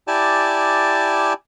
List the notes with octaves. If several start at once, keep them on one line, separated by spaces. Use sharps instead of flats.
E4 G4 D5 G#5 A5